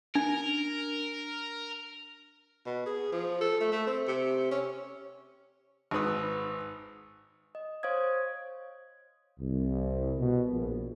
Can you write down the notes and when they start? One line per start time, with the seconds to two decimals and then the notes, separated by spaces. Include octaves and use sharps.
0.15 D4 A#4
2.66 B2
2.86 G#4
3.12 F3
3.41 A4
3.61 A3
3.72 A3
3.87 C4
4.07 C3
4.51 C#4
5.91 G#1 G#2 B4 D#6
7.55 D#5
7.83 C5 C#5 F5 D#6 G#6
9.40 C2
10.19 B2
10.51 A#1